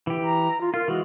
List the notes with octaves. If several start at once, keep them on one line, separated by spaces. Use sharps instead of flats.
E3 G4
A#5
F4
F4 A#4
E3 G#3 F#4